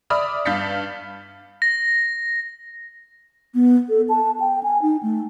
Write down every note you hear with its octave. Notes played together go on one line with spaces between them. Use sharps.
D5 E5 B5 D6 D#6 F6
G2 F5 G6 A6 B6 C#7
A#6
B3
A4
A5
G5
G#5
D#4
A3